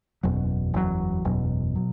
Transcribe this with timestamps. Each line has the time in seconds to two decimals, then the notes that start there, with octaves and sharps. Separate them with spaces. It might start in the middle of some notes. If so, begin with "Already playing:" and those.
0.23 F#1 E2 B2 F#3
0.74 F#1 E2 B2 F#3
1.25 F#1 E2 B2 F#3
1.76 B2 F#3